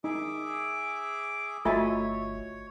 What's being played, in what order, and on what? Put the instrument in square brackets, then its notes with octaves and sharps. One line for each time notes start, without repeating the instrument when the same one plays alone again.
[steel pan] D#4 [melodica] G#4 E5 D6
[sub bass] G1 [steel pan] A3 E5 G#5 [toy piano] F4 F#4 D#5 [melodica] C#5